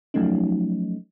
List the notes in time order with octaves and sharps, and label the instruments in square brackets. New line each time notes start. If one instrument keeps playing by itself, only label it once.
[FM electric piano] F3 F#3 A3 C#4 D#4